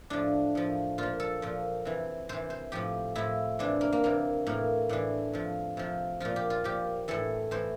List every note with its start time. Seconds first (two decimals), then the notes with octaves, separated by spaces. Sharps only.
0.10 A2 F3 D4
0.55 A2 F3
0.98 A#2 F3 F4
1.20 A4
1.42 A#2 F3
1.85 C3 E3
2.29 C3 E3 C5
2.50 C5
2.72 A2 F3 G4
3.15 A2 F3 E4
3.59 C3 E3 D4
3.81 A#3
3.93 A#3
4.03 C3 E3 A#3
4.47 A2 E3 A#3
4.89 A2 E3 D4
5.33 C3 F3
5.77 C3 F3
6.20 A#2 F3 F4
6.36 G4
6.50 F4
6.64 A#2 F3 G4
7.08 A2 E3 A4
7.51 A2 E3 C5